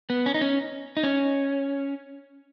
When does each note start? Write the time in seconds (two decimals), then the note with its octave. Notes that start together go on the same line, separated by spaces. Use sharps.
0.10 B3
0.26 C#4
0.34 D#4
0.41 C#4
0.97 D#4
1.03 C#4